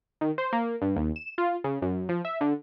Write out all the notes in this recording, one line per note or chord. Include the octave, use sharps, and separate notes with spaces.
D#3
C5
A#3
G2
D#2
E7
F4
C#3
F#2
F3
E5
D3